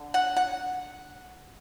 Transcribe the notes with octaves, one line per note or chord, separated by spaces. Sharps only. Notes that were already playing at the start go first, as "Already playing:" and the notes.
Already playing: D3
F#5
F#5